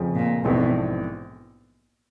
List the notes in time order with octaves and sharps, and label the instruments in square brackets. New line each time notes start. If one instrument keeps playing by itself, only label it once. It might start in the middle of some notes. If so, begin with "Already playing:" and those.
Already playing: [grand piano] F1 F2 C#3 F3
[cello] A#2
[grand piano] A#1 G#2 E3 A3 C4 [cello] B2